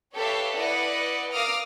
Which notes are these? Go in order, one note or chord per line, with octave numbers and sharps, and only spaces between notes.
G4 A4 B4 C#5 E5 F5
E4 B4 D5 D#5 F#5
A#4 F5 D6 D#6 F6